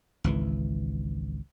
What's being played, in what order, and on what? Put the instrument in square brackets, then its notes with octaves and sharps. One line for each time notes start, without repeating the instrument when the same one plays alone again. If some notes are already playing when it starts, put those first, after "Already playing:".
[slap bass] G#1 C#2 E3